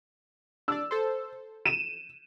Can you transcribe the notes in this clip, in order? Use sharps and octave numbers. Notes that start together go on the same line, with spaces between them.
D4 D5 E6
A4 C5
D#7 E7